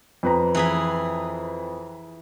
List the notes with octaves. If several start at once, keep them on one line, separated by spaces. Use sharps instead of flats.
F2 B4 A#5
E3 G#4 B5